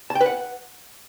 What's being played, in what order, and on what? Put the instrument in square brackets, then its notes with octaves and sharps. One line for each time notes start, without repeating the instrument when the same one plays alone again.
[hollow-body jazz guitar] A5
G5
B4
F#5